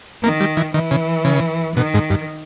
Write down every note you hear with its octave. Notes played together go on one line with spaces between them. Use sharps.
D#3 A#3
G3
E3
D#3 E3
C#3
C#3
B2 D#3
G#2
G2